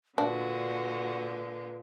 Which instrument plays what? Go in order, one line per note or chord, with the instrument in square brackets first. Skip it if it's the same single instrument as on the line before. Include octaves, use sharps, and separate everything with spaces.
[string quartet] A#2 D3 G#3 [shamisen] D4 [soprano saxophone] F#4 [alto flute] B4